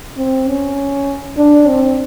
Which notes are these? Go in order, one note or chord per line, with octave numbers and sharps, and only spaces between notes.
C4
C#4
D4
C4